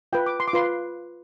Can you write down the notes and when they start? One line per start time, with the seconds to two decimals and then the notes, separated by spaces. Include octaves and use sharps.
0.13 F4 B4 G5
0.26 D6
0.40 C6
0.48 D6
0.53 F4 B4 C6